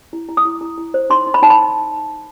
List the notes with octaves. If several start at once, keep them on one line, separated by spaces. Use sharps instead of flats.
E4
E4
D#6
E4
E4
E4
C5
D#4 C6
D#4
B5
D#4 A5
B5